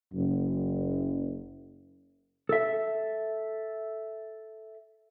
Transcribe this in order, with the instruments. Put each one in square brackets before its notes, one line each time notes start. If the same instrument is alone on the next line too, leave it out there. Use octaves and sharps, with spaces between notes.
[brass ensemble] F#1 F#2
[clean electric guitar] A4 E5